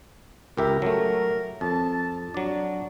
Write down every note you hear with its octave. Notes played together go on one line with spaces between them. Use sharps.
C#2 G4 A#4 E5
F#3 A3 A#4
F2 A5
F#3 D4 D5